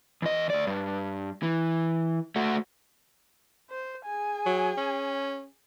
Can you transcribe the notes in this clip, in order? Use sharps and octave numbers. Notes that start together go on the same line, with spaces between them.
E2 D#5
D2 D5
G2
E3
A3 F#4
C5
G#4 G#5
F#3
C#4